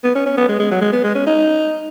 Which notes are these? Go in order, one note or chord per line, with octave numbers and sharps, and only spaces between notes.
B3
C#4
C#4
B3
G#3
G#3
F#3
G#3
B3
G#3
C#4
D#4